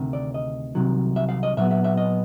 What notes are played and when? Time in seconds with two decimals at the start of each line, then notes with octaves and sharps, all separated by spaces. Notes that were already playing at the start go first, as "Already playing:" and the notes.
Already playing: D2 C3 D#3
0.13 D5
0.34 D#5
0.75 C2 C3 D#3 F#3
1.16 E5
1.29 F5
1.43 D#5
1.57 A#2 F#3 B3 E5
1.71 E5
1.84 E5
1.97 D#5